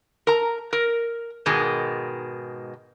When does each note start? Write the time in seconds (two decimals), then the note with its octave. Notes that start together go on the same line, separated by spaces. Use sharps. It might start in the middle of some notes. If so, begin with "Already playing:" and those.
0.27 A#4 A#5
0.73 A#4
1.46 G#2 B2 D#3 G#3